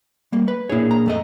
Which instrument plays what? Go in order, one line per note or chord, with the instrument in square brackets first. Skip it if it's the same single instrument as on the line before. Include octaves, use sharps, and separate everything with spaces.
[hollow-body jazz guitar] G3 A#3
B4
[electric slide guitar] A#2 D4 G#4 [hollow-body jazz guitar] E4 C#5
[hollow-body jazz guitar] A#5
F2 A3 D#5